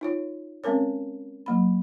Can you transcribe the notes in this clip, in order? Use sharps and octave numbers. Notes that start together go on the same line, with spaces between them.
D#4 F4 C#5
G#3 C4 C#4 A#4 C#5
F#3 A#3 B5